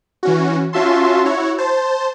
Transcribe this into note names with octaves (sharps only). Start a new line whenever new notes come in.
E3 C#4 F#4
C#4 F4 F#4 E5 A5 C6
E4 F#4 C#5
C5 A5